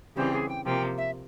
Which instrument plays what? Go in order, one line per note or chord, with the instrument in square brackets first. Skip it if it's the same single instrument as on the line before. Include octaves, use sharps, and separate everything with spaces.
[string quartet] C#3 E3 G3 C4 [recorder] G4
[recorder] G#4
G5
[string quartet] C3 F3 A#3 [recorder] G5
[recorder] E5